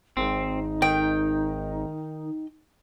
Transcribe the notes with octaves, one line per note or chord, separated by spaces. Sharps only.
G#1 C4 D#4
D#3 G5